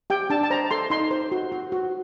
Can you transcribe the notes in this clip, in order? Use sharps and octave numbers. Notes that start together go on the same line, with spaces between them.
G4 G5
D4 A5
A5
C5 A#5
A4 C6
D#4 C6
C5
F#4
F#4
F#4